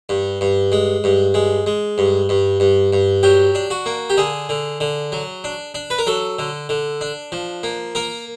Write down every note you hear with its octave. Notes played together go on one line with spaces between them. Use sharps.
G2
G2
G#3
G2
G#3
G#3
G2
G2
G2
G2
F#3 G4
D4
F#4
A#3
G4
D3 G#4
D3
D3
F#3
D4
D4
B4
A#4
F#3 A4
D3
D3
D4
F3
A#3
A#3 A#4